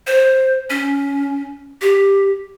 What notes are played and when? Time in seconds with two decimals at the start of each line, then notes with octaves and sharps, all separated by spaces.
0.07 C5
0.70 C#4
1.81 G4